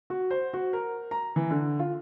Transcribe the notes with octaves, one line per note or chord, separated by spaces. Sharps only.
F#4
C5
F#4
A#4
A#5
E3
D3
F4